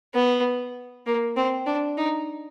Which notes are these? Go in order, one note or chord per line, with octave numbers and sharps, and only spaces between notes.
B3
A#3
C4
D4
D#4